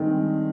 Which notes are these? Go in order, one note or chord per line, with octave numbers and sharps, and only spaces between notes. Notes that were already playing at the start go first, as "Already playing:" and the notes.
Already playing: G2 D#3 G#3 C4 D#4